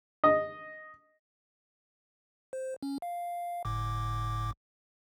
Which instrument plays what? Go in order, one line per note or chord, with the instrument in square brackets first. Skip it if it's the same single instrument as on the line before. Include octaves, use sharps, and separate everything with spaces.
[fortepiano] D#5
[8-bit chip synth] C5
C#4
F5
G1 A2 D6